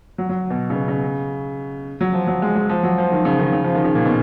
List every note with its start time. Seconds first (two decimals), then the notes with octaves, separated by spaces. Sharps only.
0.18 F#3
0.29 F#3
0.50 B2
0.70 C#3
0.75 B2
0.88 C#3
2.01 F#3
2.13 F3
2.27 F#3
2.42 G#3
2.56 G#3
2.69 F3
2.83 F#3
2.98 F3
3.12 D#3
3.25 C#3
3.39 D#3
3.53 C#3
3.64 F3
3.75 D#3
3.84 C#3
3.95 A#2
4.05 B2